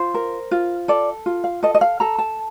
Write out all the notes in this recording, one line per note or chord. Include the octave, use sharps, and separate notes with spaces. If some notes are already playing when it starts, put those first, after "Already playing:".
Already playing: F4 C5
A#4
F4
A4 D5
F4
F5
A4 D#5
D#5
F5
A4 A#5
A5